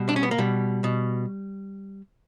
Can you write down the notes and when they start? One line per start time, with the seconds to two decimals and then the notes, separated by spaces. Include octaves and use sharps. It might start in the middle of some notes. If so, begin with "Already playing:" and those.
Already playing: B2 G3
0.09 D4
0.16 C#4
0.23 B3
0.31 A#3
0.38 B2 G3
0.84 B2